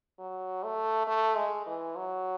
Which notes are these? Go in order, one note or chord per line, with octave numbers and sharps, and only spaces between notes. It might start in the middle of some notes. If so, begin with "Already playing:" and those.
F#3
A3
A3
G#3
E3
F#3